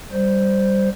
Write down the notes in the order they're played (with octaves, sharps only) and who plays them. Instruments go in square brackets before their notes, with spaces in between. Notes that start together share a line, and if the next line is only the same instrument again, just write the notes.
[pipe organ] G3 C5